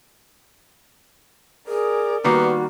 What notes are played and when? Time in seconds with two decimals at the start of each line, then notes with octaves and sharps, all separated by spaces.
1.68 G#4 A#4 D5
2.24 D#3 G3 A#3 B3 F#4